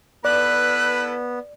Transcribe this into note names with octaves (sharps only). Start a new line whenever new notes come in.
B3 E4 A4 B4 D5 F#6